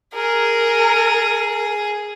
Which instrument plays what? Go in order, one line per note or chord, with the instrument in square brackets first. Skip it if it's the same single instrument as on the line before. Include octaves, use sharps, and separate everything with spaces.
[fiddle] G#4 [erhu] A#4